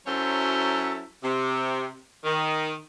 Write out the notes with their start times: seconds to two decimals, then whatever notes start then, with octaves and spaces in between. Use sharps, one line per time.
0.07 F#2 F#3 E4 A4 C5 C#5
1.23 C3
2.24 D#3